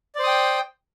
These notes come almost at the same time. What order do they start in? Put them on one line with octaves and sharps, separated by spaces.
D5 C5 D#6 G5